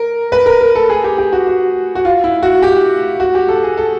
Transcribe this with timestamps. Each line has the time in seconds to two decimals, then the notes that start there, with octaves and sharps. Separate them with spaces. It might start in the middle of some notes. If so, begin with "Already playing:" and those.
Already playing: A#4
0.32 B4
0.46 A#4
0.61 A#4
0.75 A4
0.90 G#4
1.04 G4
1.18 G4
1.33 F#4
1.47 F#4
1.95 F#4
2.05 F4
2.24 E4
2.43 F#4
2.63 G4
3.20 F#4
3.35 G4
3.48 A4
3.63 G#4
3.78 A4